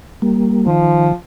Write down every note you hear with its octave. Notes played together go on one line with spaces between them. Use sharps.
G3 A#3
D#3 F3